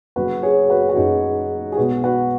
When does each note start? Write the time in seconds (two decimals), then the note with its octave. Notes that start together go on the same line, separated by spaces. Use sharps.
0.16 F#1 F#2 F#3 F#4 B4
0.43 G#4 C#5
0.70 F#4 B4
0.89 F#4
0.96 F#1 F#2 F#3 D#4 G#4
1.72 G#4
1.77 B1 B2 G#3 F#4 B4
2.04 F#4 B4